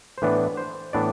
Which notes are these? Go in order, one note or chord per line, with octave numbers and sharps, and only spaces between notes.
C5
A2 E3 B3 D4 B4
C5
A2 E3 B3 D4 D5